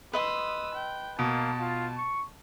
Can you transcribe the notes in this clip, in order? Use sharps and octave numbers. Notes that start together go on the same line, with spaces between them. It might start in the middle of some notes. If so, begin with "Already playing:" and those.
B4 D#5 C6 D#6 E6
G5
B2 A#3 A5
F4
C#6